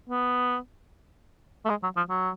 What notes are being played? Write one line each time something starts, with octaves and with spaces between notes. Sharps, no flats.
B3
A3
G#3
F#3
F3
F#3